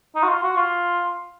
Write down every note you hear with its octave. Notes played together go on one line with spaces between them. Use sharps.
D#4
F#4
F4
F#4
F4